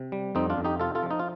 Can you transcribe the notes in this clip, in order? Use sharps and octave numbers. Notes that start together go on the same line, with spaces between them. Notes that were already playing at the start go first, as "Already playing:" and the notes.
Already playing: C3
G3
F2 C4 D#4
D4 F4
F2
D#4 G4
C3 F4 A4
F4 A4
F3
D#4
F4